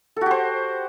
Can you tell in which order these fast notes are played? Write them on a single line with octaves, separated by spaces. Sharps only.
A4 F#4 G4 C5